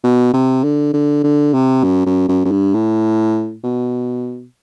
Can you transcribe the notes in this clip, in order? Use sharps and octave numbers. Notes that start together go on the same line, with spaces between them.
B2
C3
D3
D3
D3
C3
F#2
F#2
F#2
F#2
G2
A2
B2